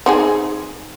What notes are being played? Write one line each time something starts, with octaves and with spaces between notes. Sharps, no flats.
C4 D#4 G#4